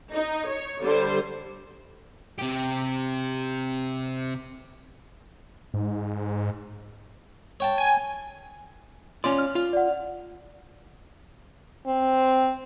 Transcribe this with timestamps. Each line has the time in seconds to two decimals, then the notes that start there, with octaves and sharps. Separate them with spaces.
0.12 D#4
0.48 C#5
0.82 D3 G3 C5
2.39 C3 G4
5.74 G#2
7.60 C#5 G5 A5
7.78 G#5
9.24 C#4 F4 D5 C6
9.38 F6
9.55 F4
9.73 D5 F#5
11.87 C4